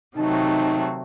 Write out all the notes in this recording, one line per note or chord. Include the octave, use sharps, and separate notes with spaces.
C3 D#3 F#3 A3 C4 D#4